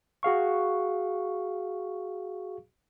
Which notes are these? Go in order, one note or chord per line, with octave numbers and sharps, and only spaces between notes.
F#4 G#4 F5 C#6